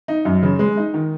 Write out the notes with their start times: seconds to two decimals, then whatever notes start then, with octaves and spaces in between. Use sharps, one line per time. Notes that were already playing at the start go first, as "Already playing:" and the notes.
0.08 D#4
0.25 F#2
0.43 C#3
0.59 G#3
0.77 D#4
0.94 D#3